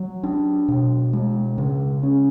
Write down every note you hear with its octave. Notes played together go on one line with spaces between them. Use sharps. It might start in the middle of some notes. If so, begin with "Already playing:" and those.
Already playing: F#3
D4
B2
G#3
C#3
C#4